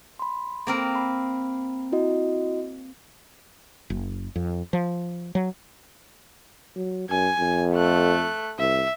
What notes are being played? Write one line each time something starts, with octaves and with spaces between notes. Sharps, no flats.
B5 C6
A#3 C4 A#4
B5
E4 F#4 D#5
F#1
F2
F3
F#3
F#3
F#2 G#5
F2
A3 F#6
C2 E5